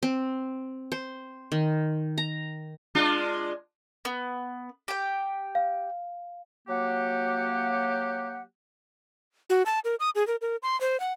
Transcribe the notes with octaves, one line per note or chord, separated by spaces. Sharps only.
C4
C5
D#3
A#5
G#3 D4 F4
B3
G4 G5
F5
F#3 A#3 G4 F#5
F#4
A5
A#4
D#6
G#4
A#4
A#4
C6
C5
F#5